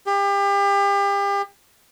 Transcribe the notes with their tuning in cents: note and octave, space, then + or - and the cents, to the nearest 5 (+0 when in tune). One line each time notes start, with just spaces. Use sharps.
G4 +35